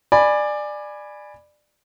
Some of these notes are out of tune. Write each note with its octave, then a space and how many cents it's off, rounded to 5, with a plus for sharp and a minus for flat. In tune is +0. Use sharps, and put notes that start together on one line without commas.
D5 +20 G#5 +0 B5 +0